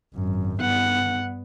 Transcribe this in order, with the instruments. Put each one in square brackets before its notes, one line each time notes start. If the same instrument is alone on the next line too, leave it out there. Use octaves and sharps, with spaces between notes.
[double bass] G#1 F#2
[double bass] G2 B3 [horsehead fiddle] F#5